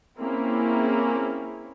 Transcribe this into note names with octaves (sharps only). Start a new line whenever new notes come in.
A#3 C4 C#4 E4 G#4